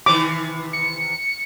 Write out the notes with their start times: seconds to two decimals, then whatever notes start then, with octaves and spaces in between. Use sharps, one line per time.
0.06 C3 D#3 E3 D6
0.73 C#7